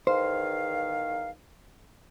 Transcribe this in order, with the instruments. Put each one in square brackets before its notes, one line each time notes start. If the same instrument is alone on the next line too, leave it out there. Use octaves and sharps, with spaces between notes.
[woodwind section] E2 D#3 F5 [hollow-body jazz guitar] C5